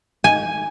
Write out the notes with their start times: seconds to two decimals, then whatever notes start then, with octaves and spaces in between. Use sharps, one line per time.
0.24 G#5